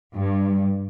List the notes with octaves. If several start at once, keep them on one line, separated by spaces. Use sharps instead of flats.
G2